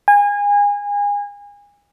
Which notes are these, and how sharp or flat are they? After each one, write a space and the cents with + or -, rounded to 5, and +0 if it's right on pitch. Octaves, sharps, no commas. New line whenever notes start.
G#5 -30